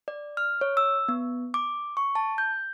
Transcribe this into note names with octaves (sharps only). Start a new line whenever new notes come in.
D5
F6
C#5
E6
B3
D6
C#6
A5
G6